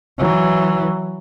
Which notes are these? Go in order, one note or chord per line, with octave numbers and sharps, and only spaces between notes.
E3 F#3